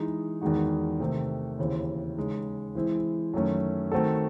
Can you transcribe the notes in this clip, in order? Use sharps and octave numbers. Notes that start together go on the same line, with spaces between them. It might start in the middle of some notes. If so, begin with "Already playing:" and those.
Already playing: E3 G#3 D#4
E2 D#3 G#3 D#4 F#4
C3 D#3 A3 C4
D#2 C#3 E3 C4
C#3 G#3 D#4
E3 G#3 C4 E4
F#2 D#3 A3 C#4
D#3 A3 C4 F#4 A4